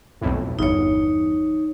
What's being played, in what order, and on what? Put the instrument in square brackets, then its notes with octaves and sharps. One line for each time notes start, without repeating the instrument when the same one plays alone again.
[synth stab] B1 F2 A2
[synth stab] G1 E2 [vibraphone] D#4 C#5